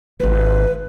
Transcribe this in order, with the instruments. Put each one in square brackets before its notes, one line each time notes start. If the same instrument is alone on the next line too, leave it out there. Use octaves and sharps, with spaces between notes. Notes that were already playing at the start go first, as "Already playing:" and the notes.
[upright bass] D#1 G#1 [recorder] B4